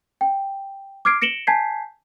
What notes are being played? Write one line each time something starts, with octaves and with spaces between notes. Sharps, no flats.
G5
D6 F6 G#6 C7 D7
A#6 C#7 D7 E7 F#7 G7
G#5 A5 G6 G#6 B6 C7